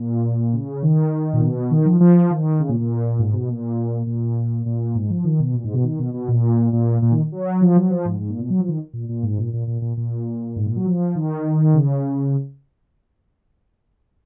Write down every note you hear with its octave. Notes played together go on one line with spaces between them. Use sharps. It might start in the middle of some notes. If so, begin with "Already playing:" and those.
Already playing: A#2
C#3
D#3
A#2
B2
D#3
F3
F3
D#3
C#3
A#2
A#2
G#2
B2
A#2
A#2
A#2
G#2
F3
D#3
B2
A#2
G#2
B2
D#3
B2
B2
A#2
A#2
A#2
D#3
F#3
F3
F#3
F3
G#2
G#2
A#2
B2
F#3
F3
D#3
A#2
A#2
G#2
A#2
A#2
A#2
A#2
A#2
G#2
A#2
F#3
F3
D#3
C#3